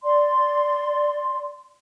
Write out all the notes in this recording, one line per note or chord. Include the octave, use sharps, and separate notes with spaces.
D5 C6